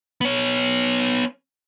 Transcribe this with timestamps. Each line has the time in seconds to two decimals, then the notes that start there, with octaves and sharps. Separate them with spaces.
0.21 B3 C#5